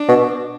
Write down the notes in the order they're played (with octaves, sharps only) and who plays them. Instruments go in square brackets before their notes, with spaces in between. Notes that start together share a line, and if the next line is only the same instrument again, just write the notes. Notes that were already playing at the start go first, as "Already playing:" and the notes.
Already playing: [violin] D4
[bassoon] B2